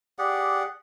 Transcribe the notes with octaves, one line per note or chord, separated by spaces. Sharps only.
G4 G#4 D5 F#5